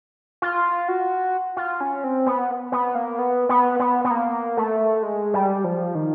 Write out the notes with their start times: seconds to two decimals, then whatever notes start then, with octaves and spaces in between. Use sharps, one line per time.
0.42 F4
0.88 F#4
1.57 F4
1.81 C#4
2.04 C4
2.26 B3
2.72 B3
2.95 A#3
3.19 B3
3.49 B3
3.80 B3
4.04 B3
4.11 A#3
4.57 A3
5.03 G#3
5.34 G3
5.64 F3
5.95 D#3